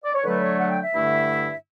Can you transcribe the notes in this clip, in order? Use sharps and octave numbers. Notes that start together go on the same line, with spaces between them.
D5
C#5
D3 F#3 A3 B4
C#5
F#5
G5
E5
G2 D3 A3 E4